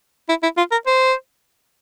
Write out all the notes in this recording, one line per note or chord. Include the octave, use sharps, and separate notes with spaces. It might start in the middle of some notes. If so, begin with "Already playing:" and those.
E4
E4
F4
A#4
C5